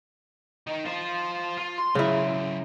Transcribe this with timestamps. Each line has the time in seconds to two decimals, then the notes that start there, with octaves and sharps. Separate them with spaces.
0.67 D#3 D#4
0.85 F4 C5
1.57 F4
1.78 C6
1.95 C#3 F#3 E4 E5